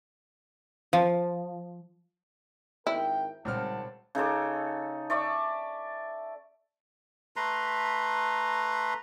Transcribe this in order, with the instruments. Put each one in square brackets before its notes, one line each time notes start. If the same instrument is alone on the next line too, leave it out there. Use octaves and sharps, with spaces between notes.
[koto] F3
[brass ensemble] G#1 A#4 G5 [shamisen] E4
[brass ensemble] G#1 F#5 A5 [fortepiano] C#2 C4 F6 [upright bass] A#2 G3
[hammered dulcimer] C#3 D#4 A4 D6
D5 E5 C#6
[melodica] A3 B4 A#5 C6